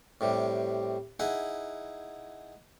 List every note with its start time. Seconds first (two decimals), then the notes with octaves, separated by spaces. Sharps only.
0.21 A2 C3 G3
1.20 D#4 E4 G#4 F#5